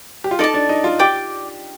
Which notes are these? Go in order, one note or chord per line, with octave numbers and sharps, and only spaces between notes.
G4
F4
D#4 A4 D5 A5
D4
D#4
F4
G4 D5 G5 D6